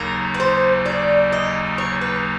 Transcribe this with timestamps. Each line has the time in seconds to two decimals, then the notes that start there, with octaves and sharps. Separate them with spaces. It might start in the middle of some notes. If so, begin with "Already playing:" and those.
Already playing: D#2 C#3 F#3 A#3 D#4 A#4
0.34 B4
0.40 C5
0.86 D5
1.32 D#5
1.78 C#5
2.01 B4